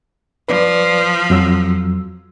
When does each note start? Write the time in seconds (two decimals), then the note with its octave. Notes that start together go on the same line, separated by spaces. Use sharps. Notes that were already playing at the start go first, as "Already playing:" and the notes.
0.48 F3 B4 D5
1.30 F2 F#3 E6